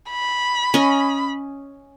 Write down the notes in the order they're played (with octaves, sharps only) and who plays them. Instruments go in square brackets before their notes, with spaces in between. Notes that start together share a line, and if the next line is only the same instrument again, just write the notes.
[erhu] B5
[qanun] C#4 D#5